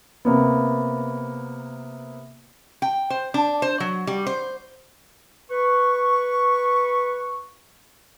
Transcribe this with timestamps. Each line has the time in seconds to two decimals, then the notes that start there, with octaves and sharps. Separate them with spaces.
0.25 C3 A#3 B3
2.82 G5
3.10 C5
3.34 D4
3.62 C5
3.80 F#3
4.07 G3
4.27 C5
5.50 B4 C#6